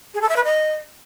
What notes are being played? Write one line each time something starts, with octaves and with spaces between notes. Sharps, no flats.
G#4
A4
E5
B4
D#5